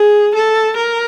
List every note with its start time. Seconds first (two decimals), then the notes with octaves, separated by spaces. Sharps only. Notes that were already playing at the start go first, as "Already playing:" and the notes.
Already playing: G#4
0.35 A4
0.77 A#4